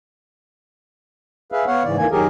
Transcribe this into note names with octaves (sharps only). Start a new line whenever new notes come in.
G#4 B4 E5 F5
B3 C#5 F5 F#5
G#2 C#3 E3 D5
F2 D#3 E3 A#3 G#5
F#2 D#3 F#3 G4 G#4 A#4